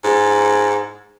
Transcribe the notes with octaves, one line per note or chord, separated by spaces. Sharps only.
G#2